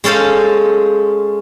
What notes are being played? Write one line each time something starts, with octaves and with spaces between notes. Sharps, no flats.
G#3 C#4 A4 C5 F5